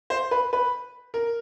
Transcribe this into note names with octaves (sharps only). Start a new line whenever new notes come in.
C5
B4
B4
A#4